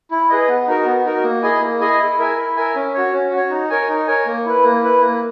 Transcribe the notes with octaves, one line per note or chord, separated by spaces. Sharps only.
E4
G#4 B4 D#5
B3
D#4 F#4 A#4
B3
D#4 F#4 A#4
A#3
E4 G#4 D#5 G#5
A#3
E4 G#4 D#5 G#5
E4
A#4 E5 G#5
E4
A#4 E5 G#5
C#4
F#4 C#5
C#4
F#4
C#5
D#4
A#4 C#5 G#5
D#4
A#4 C#5 G#5
A#3
E4 B4
A#3
E4 B4
A#3